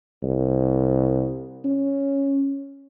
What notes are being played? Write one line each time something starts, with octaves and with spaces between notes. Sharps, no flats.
C2
C#4